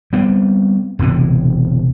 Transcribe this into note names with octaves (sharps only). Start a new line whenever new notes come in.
G3 B3 C4
E1 D2 C3 E3